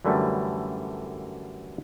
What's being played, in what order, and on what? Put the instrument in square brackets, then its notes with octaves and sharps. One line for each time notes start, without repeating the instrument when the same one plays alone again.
[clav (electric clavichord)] F#2 D3 E3 G3 A3